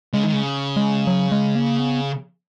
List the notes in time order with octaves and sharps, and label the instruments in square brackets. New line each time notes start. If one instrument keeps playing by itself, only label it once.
[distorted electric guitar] C#3 [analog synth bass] G#3
[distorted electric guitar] D#3
C#3
[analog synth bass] G#3
F#3
G#3
A#3
B3